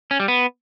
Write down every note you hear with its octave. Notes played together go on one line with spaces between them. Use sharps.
C#4
G3
B3